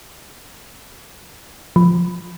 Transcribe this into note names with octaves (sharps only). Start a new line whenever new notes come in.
F3